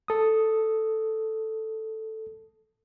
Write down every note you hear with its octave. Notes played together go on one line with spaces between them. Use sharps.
A4 D#6